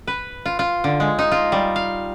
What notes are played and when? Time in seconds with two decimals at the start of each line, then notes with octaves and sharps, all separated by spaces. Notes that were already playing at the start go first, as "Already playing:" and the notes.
0.07 B4
0.46 F4
0.59 F4
0.84 D3
1.00 G#3
1.19 D#4
1.32 F4
1.52 G3
1.76 F5